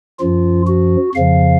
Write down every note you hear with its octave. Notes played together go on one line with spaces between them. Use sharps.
F#2 F3 F4
F#4
F2 C#3 F3 F5